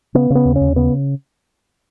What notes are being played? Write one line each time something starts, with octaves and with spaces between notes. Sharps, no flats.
C#3 B3
C#3
B3
D#2
C#4
D#2
C#3 B3